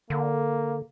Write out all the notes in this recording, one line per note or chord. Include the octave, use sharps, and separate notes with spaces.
D3 A#3